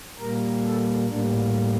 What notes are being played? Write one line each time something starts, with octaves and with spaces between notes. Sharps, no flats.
A#2 G3 A#3 A#4
A4
A2 G3 A#3 D4